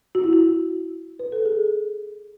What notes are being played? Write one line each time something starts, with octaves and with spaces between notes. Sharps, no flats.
F#4
E4
F#4
B4
A4
G#4